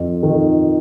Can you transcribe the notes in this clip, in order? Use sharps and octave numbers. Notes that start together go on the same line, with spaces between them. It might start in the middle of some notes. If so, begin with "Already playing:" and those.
Already playing: F2
D#3